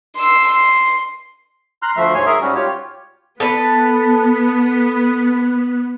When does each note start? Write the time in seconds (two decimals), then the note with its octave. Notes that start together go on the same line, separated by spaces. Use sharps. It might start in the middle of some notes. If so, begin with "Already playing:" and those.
0.16 C6 E6
0.47 C6
1.82 A#5 C6 F6 F#6
1.97 D2 F3 A3 E5 C6
2.14 G#2 C#5 G#5 C6
2.26 G#4 A#4 E5
2.41 G#2 G3 C#4 F#4
2.55 F4 G4 C#5
3.40 B3 A4 B4